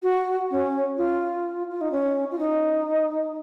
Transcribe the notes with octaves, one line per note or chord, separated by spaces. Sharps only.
F#4
C#4
F4
F4
D#4
C#4
F4
D#4